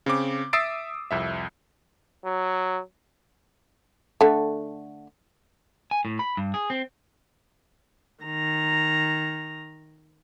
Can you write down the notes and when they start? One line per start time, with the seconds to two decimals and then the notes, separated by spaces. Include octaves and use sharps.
0.06 C#3 C4 D6
0.53 E5 D#6 E6 A6 C7 D7
1.11 C2 F2 E5
2.25 F#3
4.21 D3 A3
5.91 G#5
6.05 A2
6.19 B5
6.37 G2
6.54 G#4
6.70 C4
8.24 D#3 A#5